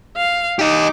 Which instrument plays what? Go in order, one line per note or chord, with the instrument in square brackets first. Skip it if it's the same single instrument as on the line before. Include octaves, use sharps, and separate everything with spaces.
[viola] F5
[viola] D#4 D6 [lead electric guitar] G4 D#5